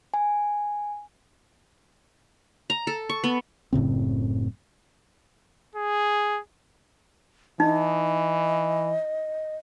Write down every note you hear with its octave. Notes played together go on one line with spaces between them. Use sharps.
G#5
A#5
A4
C#6
B3
F#1 A2 C#3 C4
G#4
E3 D#4 D#5